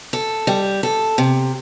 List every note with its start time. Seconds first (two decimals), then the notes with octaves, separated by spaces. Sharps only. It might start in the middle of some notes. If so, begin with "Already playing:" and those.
0.13 A4
0.47 G3
0.83 A4
1.18 C3